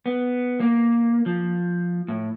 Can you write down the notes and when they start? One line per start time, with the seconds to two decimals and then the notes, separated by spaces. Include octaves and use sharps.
0.06 B3
0.60 A#3
1.26 F3
2.08 A2